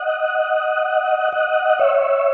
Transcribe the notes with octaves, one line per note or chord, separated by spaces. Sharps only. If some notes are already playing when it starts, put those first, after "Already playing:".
Already playing: D#5 F#5
D#5 F#5
C#5 E5